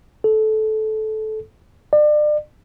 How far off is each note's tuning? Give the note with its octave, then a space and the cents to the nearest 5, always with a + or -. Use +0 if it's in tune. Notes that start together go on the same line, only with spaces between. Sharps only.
A4 -20
D5 +35